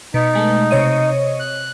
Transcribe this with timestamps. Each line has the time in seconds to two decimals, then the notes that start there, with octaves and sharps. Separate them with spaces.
0.14 B2 D#4
0.33 B2 G#3 A3
0.71 C3 C#5 D#5
1.40 F#6